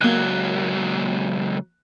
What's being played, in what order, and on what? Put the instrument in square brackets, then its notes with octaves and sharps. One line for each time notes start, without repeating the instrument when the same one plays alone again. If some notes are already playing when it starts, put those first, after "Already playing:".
[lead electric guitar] C#2 F#3 [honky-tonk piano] A#3 F#6